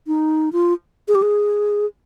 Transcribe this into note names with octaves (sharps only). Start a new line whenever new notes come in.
D#4
F4
G#4
G4
G#4